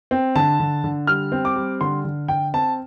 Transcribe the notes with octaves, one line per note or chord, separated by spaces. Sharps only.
C4
D3 A5
D3
D3
G3 F6
C4
D6
G3
D3 C6
D3
D3 G5
C4 A5